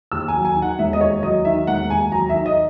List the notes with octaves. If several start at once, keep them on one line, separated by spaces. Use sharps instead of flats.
D#2 E6
G#5
F#3
G#5
D#3
F#5
E1 E5
D#5
D#2 C#5
F#3 D#5
D#3 E5
E1 F#5
D#2 G#5
F#3 A#5
D#3 E5
D#5